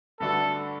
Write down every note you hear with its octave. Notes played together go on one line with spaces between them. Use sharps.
G2 D3 A3 D4 F#4 A4